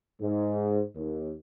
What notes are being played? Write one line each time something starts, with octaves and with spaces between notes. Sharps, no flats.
G#2
D#2